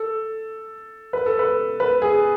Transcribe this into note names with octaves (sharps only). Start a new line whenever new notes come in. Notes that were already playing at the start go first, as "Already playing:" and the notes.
Already playing: A4
B4
A4
B4
B4
G#4